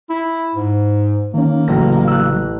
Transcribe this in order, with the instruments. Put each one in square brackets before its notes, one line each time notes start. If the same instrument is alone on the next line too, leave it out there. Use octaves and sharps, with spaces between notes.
[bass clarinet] E4
G#2
[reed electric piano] D#3 C#4 [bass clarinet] A#3
[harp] A1 A#6 [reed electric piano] C#3 F#3
[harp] E6 F#6